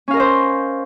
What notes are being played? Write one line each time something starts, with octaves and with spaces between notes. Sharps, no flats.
C#4 A#4 C5 D#5 F5